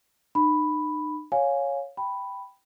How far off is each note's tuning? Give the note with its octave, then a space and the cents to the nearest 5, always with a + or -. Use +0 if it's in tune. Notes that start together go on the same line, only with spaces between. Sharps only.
D#4 -40 B5 +0
C#5 +0 F5 +15 G#5 +0
G5 +0 B5 +0